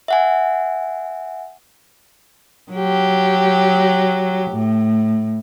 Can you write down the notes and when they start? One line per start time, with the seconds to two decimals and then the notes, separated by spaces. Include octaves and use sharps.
0.08 E5 F#5 G#5
2.72 F#3 G4
4.52 A2